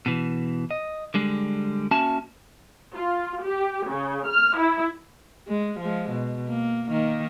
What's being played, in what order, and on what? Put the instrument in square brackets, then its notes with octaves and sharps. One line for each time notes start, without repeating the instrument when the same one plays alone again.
[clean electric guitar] B2 E3
D#5
D3 G3 G#3
A#3 C#4 F#4 E5 G#5 A5
[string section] F4
G4
C#3
F6
E4
[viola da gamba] G#3
F3 G#3
B2
A#3
D#3 A#3 D#4